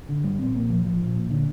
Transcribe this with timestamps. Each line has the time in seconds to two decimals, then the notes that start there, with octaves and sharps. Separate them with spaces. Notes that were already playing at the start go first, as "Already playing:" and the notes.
0.09 D3
0.24 G1 G3
0.39 A#1 C4
0.55 A#1 A#3
0.69 A#2 F3
0.85 A#1 F3
1.00 A#1
1.16 A#2
1.30 D3